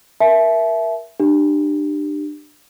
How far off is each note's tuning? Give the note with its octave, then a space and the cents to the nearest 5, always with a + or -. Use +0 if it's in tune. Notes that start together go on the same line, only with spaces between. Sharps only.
A#4 +20 E5 +0 A5 -40
D4 +30 G4 +0